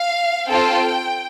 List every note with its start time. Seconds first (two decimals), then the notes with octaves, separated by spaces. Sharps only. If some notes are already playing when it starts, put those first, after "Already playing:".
Already playing: F5
0.49 C4 F4 A4 G5